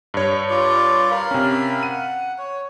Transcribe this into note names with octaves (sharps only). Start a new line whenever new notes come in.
G2 C#5
F4 D5
A#4 F5 B5
C3 C#4
F#5 D#7
C#5